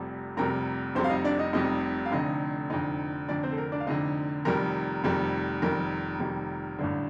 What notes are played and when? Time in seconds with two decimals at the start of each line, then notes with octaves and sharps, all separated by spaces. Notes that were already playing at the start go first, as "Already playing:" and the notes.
Already playing: F1 F2 C3 G3
0.37 F1 F2 C3 G3 A#4 A#5
0.95 F1 F2 C3 G3 C5 C6
1.04 F5
1.10 D#4 D#5
1.24 D4 D5
1.39 D#4 D#5
1.53 F1 F2 C3 G3 D#4 D#5
2.06 F5
2.12 F1 F2 D3 D#4 D#5
2.70 F1 F2 D3 D#4 D#5
3.28 F1 F2 D3 D4 D5
3.43 C4 C5
3.52 A4
3.58 A#4
3.72 D4 D5
3.80 F5
3.87 F1 F2 D3 D#4 D#5
4.45 F1 F2 D#3 G3 A#4
5.04 F1 F2 D#3 G3
5.62 F1 F2 D#3 G3 A#4
6.20 F1 F2 D#3 G3
6.79 A1 G2 D3